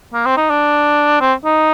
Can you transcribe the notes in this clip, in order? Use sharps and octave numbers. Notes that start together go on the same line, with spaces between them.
A#3
C4
D#4
D4
C4
D#4